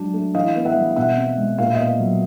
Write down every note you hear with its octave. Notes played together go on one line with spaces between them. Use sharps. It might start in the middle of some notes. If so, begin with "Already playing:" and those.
Already playing: F#3 G#3 D4
A3
E3 D#5 F5
B3
E5 F#5
G3
B2 E5 F#5
C4
G#3
A#2 F5
E5
B3 D#5 F5
F#3